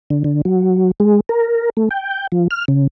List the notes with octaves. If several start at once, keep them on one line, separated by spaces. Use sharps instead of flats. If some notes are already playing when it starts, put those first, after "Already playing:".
D3
D3
F#3
G#3
A#4
A3
G5
F3
F6
C#3